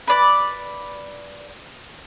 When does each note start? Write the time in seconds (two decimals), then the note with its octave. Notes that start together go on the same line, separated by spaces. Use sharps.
0.08 B4 D5